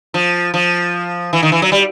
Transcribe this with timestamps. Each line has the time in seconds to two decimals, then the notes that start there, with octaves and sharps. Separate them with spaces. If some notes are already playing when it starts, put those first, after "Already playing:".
0.14 F3
0.54 F3
1.33 E3
1.43 D#3
1.52 E3
1.62 F#3
1.72 G3